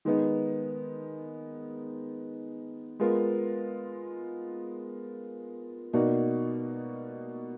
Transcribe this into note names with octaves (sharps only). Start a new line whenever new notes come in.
D#3 G#3 B3 D#4
G#3 B3 F4 A#4
B2 A#3 D#4 F#4 D5